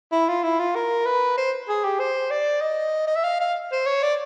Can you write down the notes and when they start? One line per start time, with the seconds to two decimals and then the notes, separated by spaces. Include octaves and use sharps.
0.12 E4
0.28 F4
0.43 E4
0.59 F4
0.75 A#4
1.06 B4
1.38 C5
1.69 G#4
1.84 G4
2.00 C5
2.31 D5
2.61 D#5
3.07 D#5
3.16 E5
3.24 F5
3.40 F5
3.72 C5
3.86 C#5
4.03 D5